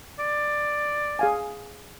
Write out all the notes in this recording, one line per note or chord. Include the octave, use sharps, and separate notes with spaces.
D5
G#4 F5 G#5